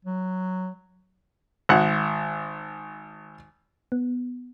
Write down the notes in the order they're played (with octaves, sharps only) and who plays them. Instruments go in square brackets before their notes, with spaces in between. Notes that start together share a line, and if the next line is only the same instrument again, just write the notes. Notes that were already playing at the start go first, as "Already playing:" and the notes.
[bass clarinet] F#3
[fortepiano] G#1 F#5
[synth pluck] B3